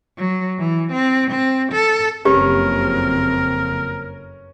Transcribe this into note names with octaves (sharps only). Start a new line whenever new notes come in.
F#3
E3
C4
C4
A4
F#1 F2 C4 C#4 G4 A#4 B4